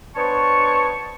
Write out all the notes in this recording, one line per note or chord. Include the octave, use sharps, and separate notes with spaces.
B3 D4 C5 C#5 A5 C#6